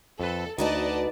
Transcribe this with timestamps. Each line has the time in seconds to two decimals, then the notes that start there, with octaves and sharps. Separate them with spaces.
0.20 F2 A4 B4
0.58 D2 D#4 F#4 B4 D5 D#5 A5